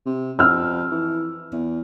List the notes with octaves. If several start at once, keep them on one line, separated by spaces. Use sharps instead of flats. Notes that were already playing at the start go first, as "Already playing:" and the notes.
C3
F2 E6 F6
E3
E2